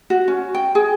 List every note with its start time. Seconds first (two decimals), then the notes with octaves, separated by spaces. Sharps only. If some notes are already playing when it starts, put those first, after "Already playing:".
0.10 F#4
0.28 C#4
0.55 G5
0.75 G#4